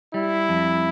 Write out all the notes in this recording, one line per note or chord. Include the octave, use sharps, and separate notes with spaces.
G3 E4
F2